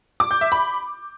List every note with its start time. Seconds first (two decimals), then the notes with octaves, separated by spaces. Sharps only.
0.20 D6
0.31 G6
0.41 E5
0.52 B5